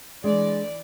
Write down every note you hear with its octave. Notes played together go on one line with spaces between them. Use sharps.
E3 G#3 D4 D5